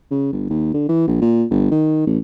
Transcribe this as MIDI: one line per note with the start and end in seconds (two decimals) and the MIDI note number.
0.11 0.31 49
0.32 0.47 31
0.50 0.71 39
0.74 0.86 50
0.89 1.07 52
1.07 1.20 34
1.21 1.44 46
1.51 1.70 31
1.71 2.06 51
2.07 2.18 33